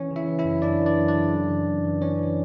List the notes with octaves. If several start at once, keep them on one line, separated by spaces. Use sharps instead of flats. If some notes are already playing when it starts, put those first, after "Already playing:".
Already playing: E3 C#4 C#5
C#3
E4 E5
E3
E4 E5
F#2
F#2 D4 D5
E3
D4 D5
F#2
D4 D5
C#3
F#2
E3
F#2
E3
E3 C#4 C#5
E3